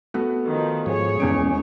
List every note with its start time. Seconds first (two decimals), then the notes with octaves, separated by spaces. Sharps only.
0.14 A3 B3 F#4
0.44 D#3 F3
0.86 G#2 F3 G#4 C#5
1.20 D#1 E2 G#3 C#4 D7